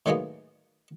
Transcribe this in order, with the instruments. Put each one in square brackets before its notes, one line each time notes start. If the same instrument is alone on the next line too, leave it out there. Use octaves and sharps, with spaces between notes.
[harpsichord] A2 D#3 F#3 G#3 A#3 B3